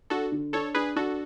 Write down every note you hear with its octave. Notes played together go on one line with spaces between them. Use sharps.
D4 F#4 A4
D3
D4 A4 C#5
D4 G#4 B4
D4 F#4 A4